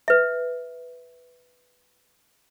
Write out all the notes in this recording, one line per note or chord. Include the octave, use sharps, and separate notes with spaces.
B4 E5